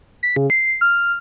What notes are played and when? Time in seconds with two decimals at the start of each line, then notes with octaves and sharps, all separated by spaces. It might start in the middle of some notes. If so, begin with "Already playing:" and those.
0.23 B6
0.36 C#3
0.50 C7
0.81 F6